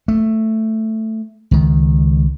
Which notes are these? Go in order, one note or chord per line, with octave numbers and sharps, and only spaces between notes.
A3
C#2 D#3